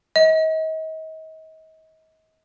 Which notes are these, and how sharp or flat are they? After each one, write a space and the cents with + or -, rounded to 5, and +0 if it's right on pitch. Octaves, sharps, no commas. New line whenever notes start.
D#5 +35